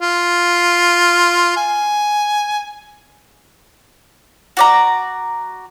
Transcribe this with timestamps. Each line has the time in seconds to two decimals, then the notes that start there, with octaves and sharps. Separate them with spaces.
0.01 F4
1.57 G#5
4.57 F#4 D5 A#5